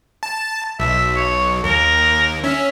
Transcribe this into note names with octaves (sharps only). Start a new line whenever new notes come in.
A5
B1 E5
C#5
D#2 A#4
C#4 E5